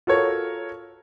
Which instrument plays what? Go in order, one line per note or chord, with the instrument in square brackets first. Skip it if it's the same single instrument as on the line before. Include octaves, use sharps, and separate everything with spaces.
[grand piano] F4 F#4 A4 A#4 C#5